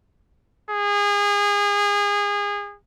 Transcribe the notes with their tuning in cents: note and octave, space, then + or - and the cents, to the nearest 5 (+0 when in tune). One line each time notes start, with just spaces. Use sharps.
G#4 -30